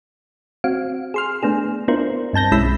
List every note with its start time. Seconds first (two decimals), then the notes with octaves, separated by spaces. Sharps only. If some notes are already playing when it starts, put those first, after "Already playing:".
0.64 C4 F#4 F5
1.14 G#4 C6 F6
1.43 A3 B3 D4 G#4
1.88 B3 D4 E4 F4 A#4 C5
2.33 G2 C4 A5 G6 A#6
2.52 B1 G#3 C#4 E4 B5 E6